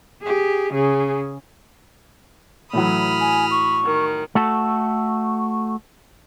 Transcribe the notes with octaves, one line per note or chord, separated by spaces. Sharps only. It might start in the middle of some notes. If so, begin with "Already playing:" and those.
G4 G#4
C#3 G#4
A2 E3 F#3 B5 D#6 F6
G#5
C#6
D#3
A3 F#4 A4